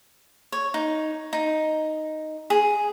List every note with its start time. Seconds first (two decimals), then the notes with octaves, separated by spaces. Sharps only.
0.52 C#5
0.74 D#4
1.33 D#4
2.50 G#4